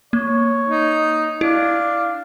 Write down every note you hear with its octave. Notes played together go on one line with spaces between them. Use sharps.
A#3 C#5
D#4
D4 E4 F5